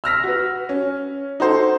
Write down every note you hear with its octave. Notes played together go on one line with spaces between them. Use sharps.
E6 F6 A#6 B6
F#4 B4
C#4
D#4 F#4 A4 C5